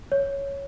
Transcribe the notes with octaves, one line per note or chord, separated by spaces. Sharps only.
C#5